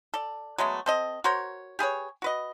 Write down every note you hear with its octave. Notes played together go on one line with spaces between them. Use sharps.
A4 D5
F#3 G#3 A3 B3
C4 A4 D#5
F#4 A#4 C5 C#5
G4 G#4 B4 C#5
F#4 B4 D#5